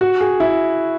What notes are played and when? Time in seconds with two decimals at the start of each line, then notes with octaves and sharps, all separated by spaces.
0.01 F#4
0.20 G#4
0.40 E4